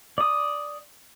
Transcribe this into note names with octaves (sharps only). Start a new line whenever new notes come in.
D5 D#6